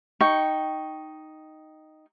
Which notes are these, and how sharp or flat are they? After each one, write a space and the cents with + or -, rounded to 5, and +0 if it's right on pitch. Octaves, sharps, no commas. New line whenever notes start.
D#4 +0 G5 -5 C#6 +0